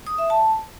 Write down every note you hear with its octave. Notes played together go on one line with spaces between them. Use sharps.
D#6
E5
A5